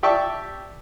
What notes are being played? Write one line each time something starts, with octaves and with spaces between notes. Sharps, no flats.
G4 D5 E5 G5 A5 C#6